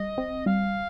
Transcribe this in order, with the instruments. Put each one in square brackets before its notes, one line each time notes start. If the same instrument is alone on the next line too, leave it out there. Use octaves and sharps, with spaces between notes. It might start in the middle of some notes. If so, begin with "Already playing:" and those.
Already playing: [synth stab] G3 [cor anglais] D#5
[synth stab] C4
[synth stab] G3 [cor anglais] F5